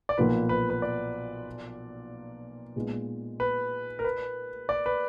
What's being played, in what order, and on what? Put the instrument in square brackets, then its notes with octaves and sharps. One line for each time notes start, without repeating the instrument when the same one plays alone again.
[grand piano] D5
[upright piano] B1 A#2 F3 A#3 F4 [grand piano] B4
[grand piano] B4
B4
D5
[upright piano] A#2 G#3 B3 D#4
[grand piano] B4
A#4
B4
D5
B4